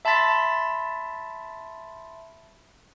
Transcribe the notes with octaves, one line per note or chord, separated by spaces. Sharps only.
E5 A5 B5 C6 A6 B6